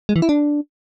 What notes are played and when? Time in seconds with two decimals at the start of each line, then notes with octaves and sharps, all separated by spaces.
0.09 G#3
0.16 E3
0.22 E4
0.29 D4